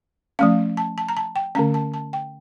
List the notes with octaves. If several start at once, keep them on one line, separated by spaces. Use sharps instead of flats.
F3 A3 C#4 F5
A5
A5
A#5
A5
G5
D3 A3 C#4 A#5
A5
A5
G5